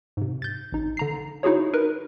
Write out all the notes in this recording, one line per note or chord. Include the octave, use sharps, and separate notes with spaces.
G#2 C3
G6 A6
A1 D#4
D3 A#5 C7
D#4 E4 F#4 G#4 C#5
D#4 A#4 B4